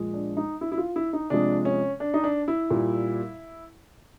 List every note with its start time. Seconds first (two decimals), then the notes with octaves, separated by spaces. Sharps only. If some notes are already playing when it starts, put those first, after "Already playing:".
Already playing: A#2 F3 G#3
0.14 D4
0.37 D#4
0.61 E4
0.72 E4
0.78 F4
0.96 E4
1.13 D#4
1.30 C3 F3 G#3 D4
1.65 C#4
2.00 D4
2.14 D#4
2.24 D4
2.48 E4
2.70 A#2 G3